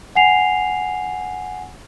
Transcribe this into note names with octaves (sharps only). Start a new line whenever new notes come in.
F#5 G#5 C7 F7